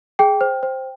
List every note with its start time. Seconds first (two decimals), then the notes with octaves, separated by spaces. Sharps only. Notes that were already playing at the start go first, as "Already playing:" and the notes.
0.19 G#4 G5
0.41 C5
0.63 C5